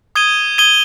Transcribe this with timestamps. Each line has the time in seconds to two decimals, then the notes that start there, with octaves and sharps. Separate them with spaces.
0.15 D#6 G#6 D#7 G7
0.58 D#6 G#6 D#7 G7